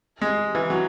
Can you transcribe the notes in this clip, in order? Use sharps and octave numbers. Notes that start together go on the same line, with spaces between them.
G#3
E3
F#3